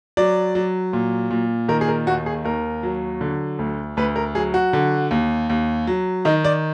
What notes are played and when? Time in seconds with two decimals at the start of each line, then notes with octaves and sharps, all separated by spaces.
0.17 F#3 D5
0.55 F#3
0.93 A#2
1.31 A#2
1.69 D#3 A#4
1.81 G#4
1.88 A#4
2.07 D#2 F#4
2.26 G#4
2.45 D#2 A#4
2.83 F#3
3.21 D3
3.59 D2
3.97 D2 B4
4.16 A#4
4.35 F#3 G#4
4.54 F#4
4.73 D3
5.11 D#2
5.50 D#2
5.87 F#3
6.25 D#3 D#4
6.44 D5